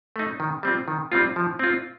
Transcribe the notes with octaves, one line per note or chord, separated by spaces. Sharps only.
A3 D#4
D#3
G3 C4 F4
D#3
G3 C4 F4
F3
C4 F4